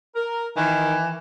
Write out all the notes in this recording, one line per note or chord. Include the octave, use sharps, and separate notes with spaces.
A#4
D#3 E3